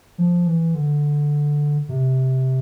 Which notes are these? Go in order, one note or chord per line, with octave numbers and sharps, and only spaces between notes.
F3
E3
D3
C3